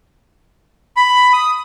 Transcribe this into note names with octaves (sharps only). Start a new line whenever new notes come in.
B5
D#6